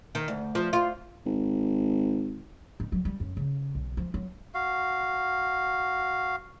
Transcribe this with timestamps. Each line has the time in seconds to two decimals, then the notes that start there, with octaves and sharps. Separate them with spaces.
0.15 D#3
0.28 D2
0.55 F3
0.73 F4
1.26 G#1
2.80 D#4
2.92 F#3
3.05 G3
3.20 F#2
3.37 C#3
3.75 B1
3.97 F3
4.14 F#3
4.54 F#4 F5